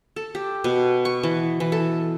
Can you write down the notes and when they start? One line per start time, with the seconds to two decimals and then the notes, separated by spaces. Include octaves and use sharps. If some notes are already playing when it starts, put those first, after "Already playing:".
0.16 A4
0.35 G4
0.64 B2
1.05 C#6
1.23 E3
1.60 E3
1.72 A4